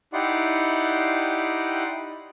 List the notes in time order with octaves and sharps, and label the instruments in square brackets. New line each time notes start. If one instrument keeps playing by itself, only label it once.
[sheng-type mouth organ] D#4 E4 G4 D5 F#5 C6